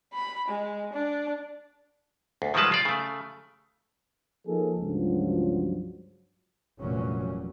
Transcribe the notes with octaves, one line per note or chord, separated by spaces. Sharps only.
B5
G#3
D4
D2
D#3 F3 G3 G#3 B4 A5
F4 D5
C#3 A3
F3 A#3 D#4 G#4 A4
C#2 G2 F3 F#3
F1 A#2 E3 F#3 G3 C#4